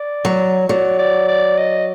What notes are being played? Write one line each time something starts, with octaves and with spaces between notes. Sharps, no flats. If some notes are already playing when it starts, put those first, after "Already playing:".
Already playing: D5
F#3
F#3 D5
D5
D5
D#5